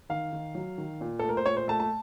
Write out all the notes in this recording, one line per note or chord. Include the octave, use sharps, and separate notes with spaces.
D#3 F5
D#3
F#3
D#3
A#2
A4
A3
A#4
C5
A#2 C#5
C5
A3 A5
A5